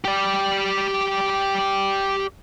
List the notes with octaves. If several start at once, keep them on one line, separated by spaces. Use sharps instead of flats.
G4 D5